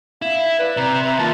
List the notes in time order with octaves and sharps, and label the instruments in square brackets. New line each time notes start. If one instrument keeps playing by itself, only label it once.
[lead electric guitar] E4 [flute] F5
[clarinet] B4 [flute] D5
[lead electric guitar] C3 [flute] A#5
[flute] E5
[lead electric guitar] D#3 A#3 [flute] F4 [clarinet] A5